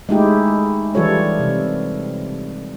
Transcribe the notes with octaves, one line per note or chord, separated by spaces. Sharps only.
G#3 A3 D#4 E4 G4
E3 G3 F4 A4 C#5
C3